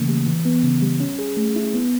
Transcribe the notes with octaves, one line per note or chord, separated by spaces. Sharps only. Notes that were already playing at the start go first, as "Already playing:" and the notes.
Already playing: C#3 E3 A3 A#3
G3
E3
B3
C#3
G3
C#4
G#4
A3
E4
B3